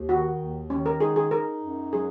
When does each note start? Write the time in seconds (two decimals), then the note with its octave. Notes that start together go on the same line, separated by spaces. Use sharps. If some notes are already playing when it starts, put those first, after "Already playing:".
Already playing: D#2
0.09 D#3 F#4
0.40 D#2
0.70 D#3 C#4
0.86 A#4
1.00 D#4 G#4
1.16 G#4
1.31 D#4 A#4
1.62 F#2
1.92 F#3 G#4